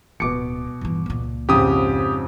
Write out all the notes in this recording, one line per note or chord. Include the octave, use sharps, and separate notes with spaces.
D1 B2 G#3 D6 C#7
G1 E3
C#2 A#2
F2 G#2 C#3 G4 D#6